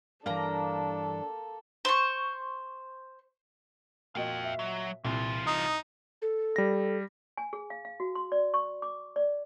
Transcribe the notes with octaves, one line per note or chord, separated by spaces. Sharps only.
G2 E3 A#3 D4 A4 A#5
C5 C#6
A#2 F#4 D#5 F5 G5
E5
F#3
C2 A#2 E3 F4
D#4 D#6
A4
G3 A#6
G#5
G#4
F5
F5
F#4
C6
D5
C#6
D6
D5